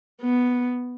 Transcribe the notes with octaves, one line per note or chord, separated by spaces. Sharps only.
B3